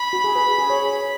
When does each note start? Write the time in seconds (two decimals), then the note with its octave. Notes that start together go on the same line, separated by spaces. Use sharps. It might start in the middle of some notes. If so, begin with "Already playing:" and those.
Already playing: B5
0.13 F#4
0.24 G#4
0.35 B4
0.59 G#4
0.70 C#5